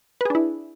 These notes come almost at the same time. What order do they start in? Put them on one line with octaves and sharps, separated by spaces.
B4 G#4 D4 E4